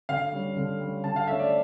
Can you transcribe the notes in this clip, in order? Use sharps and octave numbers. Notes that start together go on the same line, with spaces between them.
D3 F5
G3 C#4
D3
G3 C#4
D3 A5
F5
A3 C#4 E5
D5